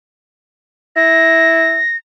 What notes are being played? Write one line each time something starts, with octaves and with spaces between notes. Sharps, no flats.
E4 A#6